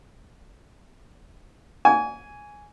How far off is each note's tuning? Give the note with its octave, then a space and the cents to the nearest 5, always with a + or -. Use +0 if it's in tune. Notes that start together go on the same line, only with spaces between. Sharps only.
G#5 +0 C#6 +45